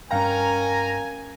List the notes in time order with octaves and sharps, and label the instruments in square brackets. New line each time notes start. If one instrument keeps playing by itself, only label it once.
[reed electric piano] G2 F5 G5 [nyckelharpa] C#4 A#4 [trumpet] G#5 [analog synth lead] A#5